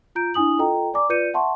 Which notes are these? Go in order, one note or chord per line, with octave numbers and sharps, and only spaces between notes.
F4 A#5 G6 D7
D4 E4 G#5 D#6 F#7
F4 A4 D#5 G5 A#5
D5 G#5 A#5 D6
F4 B4 D5 G6 C#7 D#7
E5 F#5 A5 C6 C#6